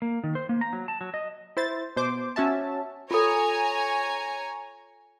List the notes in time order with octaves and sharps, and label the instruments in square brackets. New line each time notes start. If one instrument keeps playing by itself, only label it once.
[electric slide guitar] A#3
D#3
C5
A#3
A#5
F#3
A5
F#3
D#5
[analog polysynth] E4 C5 A6
B2 C5 D6
C#4 F#4 E5 A5
[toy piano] F4 A4 [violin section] C#5 G#5 A#5